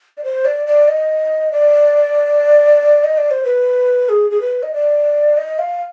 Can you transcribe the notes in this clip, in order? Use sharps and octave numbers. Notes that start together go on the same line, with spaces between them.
D5
C5
D5
D5
D#5
D5
D#5
D5
C5
B4
G#4
G#4
B4
D#5
D5
D#5
F5